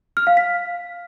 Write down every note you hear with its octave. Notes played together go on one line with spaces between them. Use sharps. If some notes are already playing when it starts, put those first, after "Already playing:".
F6
F5
B6